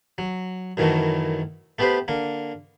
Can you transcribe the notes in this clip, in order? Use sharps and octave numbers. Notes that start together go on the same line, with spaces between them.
F#3
F#2 A2 D#3 E3 F#3 A3
A3 B3 G4 B4 C5
D3 A#3